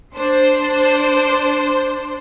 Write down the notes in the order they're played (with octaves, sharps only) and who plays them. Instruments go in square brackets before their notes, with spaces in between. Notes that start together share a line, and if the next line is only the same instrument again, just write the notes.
[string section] D4 C5 C6